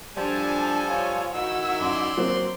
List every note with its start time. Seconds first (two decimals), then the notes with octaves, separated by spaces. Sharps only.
0.17 F3 G3 D4 A4 G#5 A5
0.86 F4 C#5
1.34 D#3 D#4 E4 F#4 E6
1.80 F#2 D5 C6
2.17 F#3 A#3 C4